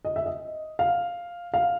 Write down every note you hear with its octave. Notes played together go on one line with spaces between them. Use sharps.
D#5
E5
D#5
F5
F5